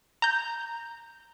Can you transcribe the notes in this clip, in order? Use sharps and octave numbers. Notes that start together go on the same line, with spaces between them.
A#5 G6